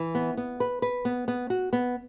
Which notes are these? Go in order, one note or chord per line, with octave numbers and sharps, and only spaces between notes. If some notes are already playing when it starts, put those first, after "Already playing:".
Already playing: E3
B3
B3
B4
B4
B3
B3
F#4
B3